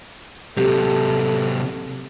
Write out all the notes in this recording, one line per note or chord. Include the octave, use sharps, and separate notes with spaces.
C3 F#3 G4 A4